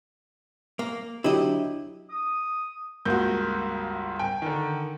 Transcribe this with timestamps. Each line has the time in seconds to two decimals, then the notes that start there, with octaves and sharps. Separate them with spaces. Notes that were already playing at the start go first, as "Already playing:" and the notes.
0.79 A#3
1.24 D3 F#3 E4 G4 D#5
2.10 D#6
3.05 C#2 G2 A#3 F#4 G6
4.19 G5 G#5
4.42 D3 D#3